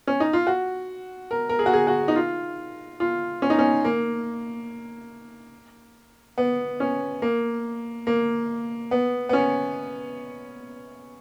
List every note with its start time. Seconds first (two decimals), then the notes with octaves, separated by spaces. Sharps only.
0.07 C#4
0.20 D#4
0.33 F4
0.47 F#4
1.31 A#4
1.49 A#4
1.59 G#4
1.66 F#4
1.73 G#4
1.87 F#4
2.08 D#4
2.16 F4
3.00 F4
3.42 C#4
3.50 D#4
3.59 C#4
3.85 A#3
6.38 B3
6.80 C#4
7.22 A#3
8.07 A#3
8.91 B3
9.29 B3
9.33 C#4